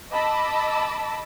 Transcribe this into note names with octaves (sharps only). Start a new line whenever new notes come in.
D#5 A5 B5 D6 E6